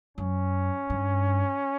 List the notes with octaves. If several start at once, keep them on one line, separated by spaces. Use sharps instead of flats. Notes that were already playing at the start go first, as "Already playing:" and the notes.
F#2 C#4
G2